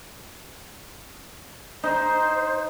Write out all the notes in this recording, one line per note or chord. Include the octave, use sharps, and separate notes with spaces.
D#4 C5